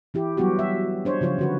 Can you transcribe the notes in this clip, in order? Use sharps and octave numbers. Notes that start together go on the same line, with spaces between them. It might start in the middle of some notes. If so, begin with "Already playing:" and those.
E3 E4 G4
F#3 G3 B3 F#4 G4
E5
D4 C5 C#5
C#3 F3 F4 C#5
D3 F#4 B4